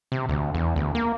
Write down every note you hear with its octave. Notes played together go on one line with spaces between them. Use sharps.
C3
D2
E2
D2
A#3